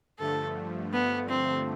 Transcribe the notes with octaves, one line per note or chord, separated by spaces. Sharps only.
G2 D3 F3 A3 A4
B3
C4